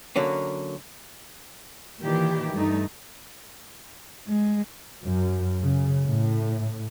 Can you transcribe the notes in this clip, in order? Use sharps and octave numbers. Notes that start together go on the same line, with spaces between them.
D3 F#3 A#3 C#4
A#2 D#3 E3 E4 G4
G2 A3 D#4
G#3
F#2
C#3
A2